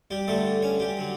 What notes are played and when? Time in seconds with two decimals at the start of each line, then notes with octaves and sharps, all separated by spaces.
0.11 G3 G4
0.28 G2 D3 G3 A3 A4
0.62 C#4 C#5
0.80 G3 G4
0.97 D3 F#3